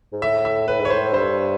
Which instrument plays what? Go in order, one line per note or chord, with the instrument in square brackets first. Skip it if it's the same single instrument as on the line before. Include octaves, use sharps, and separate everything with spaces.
[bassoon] G#2
[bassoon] A2 [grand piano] E5
[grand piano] E5
[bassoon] A2 [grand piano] B4
[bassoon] G#2
[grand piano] C#5
[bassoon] A2 [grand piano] C5
[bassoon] G2 [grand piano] C5